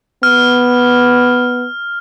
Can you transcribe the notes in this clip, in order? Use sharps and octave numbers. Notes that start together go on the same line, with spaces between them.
B3 F6